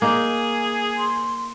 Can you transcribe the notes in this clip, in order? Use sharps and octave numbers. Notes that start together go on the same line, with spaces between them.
A#3 D#4 G#4
C6